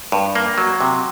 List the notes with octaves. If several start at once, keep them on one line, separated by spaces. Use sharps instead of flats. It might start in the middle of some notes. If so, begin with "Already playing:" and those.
G2
A#3
F#3
C3